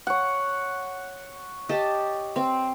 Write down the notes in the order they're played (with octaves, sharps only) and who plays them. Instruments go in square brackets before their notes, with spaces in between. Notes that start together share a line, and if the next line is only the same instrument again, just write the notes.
[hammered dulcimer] C#5 F#5
[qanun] G4 D#5 A5
C4